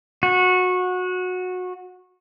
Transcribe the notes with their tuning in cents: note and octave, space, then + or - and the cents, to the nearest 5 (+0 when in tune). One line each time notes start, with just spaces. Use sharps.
F#4 -20